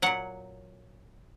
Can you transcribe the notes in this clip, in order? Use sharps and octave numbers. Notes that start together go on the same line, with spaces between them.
A#2 F#3 F#5